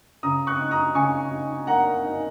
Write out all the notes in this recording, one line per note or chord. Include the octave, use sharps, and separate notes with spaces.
C#3 A#5 D#6
C#6 F#6
D#4
A#5 D#6
C#3 G#5 C#6
D#4
A#3 F#5 A#5
D#4